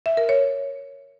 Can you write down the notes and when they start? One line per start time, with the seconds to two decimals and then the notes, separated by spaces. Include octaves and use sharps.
0.06 E5
0.17 A#4
0.29 C#5